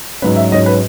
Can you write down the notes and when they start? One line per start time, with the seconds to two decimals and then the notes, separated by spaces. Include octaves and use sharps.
0.22 G#2 F#3 C#4 B4
0.36 E5
0.52 G#2 F#3 C#4 D#5
0.66 B4